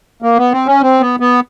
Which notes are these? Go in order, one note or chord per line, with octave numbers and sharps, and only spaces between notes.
A#3
B3
C4
C#4
C4
B3
B3